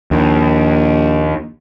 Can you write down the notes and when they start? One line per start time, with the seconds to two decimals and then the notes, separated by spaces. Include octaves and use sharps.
0.11 A#1 D#2